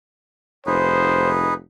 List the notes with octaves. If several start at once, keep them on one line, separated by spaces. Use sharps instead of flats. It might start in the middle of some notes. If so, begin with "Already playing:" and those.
F1 D#4 G#4 B4 C5